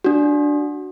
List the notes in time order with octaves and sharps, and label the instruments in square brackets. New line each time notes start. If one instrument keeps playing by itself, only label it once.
[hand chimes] D4 F#4